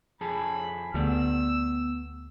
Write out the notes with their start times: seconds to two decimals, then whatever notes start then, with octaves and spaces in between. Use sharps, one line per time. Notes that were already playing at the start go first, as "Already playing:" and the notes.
0.21 F2 G#4 A5 B5
0.94 D2 B3 G4 D5 E6